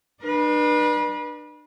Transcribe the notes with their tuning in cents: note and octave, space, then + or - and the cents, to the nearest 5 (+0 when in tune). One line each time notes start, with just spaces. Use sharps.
D4 +40 B4 -30